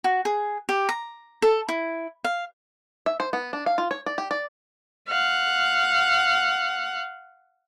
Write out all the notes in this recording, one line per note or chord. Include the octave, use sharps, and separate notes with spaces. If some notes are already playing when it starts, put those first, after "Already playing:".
F#4
G#4
G4
A#5
A4
E4
F5
E5
C5
B3
D4
F5
F4
C#5
D5
G4
D5
F5 F#5